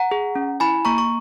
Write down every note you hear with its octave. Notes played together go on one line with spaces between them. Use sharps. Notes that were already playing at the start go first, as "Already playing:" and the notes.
Already playing: F#5 A#5
G#4
C#4
E4 G#5 B5
A#3 A#5 C#6
C#6